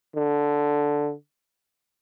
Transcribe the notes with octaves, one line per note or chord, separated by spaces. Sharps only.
D3